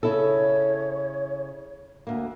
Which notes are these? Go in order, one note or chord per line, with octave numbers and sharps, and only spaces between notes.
C#3 E4 A4 C#5
D2 A#3